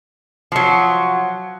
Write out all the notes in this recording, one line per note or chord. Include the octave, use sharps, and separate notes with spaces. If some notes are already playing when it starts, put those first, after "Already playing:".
F3 F#3